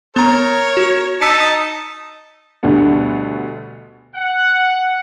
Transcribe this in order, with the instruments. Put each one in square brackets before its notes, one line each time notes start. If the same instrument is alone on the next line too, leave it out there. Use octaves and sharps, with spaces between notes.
[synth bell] B3 A#5 [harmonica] A#4 C#5
[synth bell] F#4
[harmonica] D#4 A5 [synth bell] E6 B6 C#7
[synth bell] D#6
[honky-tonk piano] D2 B2 D3 G3 B3 A4
[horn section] F#5